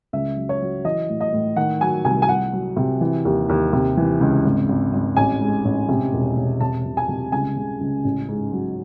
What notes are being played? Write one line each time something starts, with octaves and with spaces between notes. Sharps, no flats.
C#2 E5
F#3
C#5
F#3
E3 D#5
A2
D#5
A2
D#3 F#5
F#3 G#5
C2 G#5
G#5
C2 F#5
F#3
C3
E3
D#2
D#2
C3
E3
C#2
G#1
G#1
G#1
A1 G#5
G#2
A1
C3
E1
E1
C3 A5
E1
G#5
C3
C#2 G#5
C#3
C#2
A1
G#2
F#3